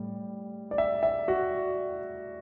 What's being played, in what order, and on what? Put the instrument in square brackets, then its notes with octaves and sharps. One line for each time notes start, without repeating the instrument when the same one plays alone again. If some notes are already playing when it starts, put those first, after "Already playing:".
Already playing: [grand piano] A2 G3
D5
E5
E5
F#4